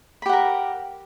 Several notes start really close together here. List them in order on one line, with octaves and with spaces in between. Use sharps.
B5 G4 F#5 A#4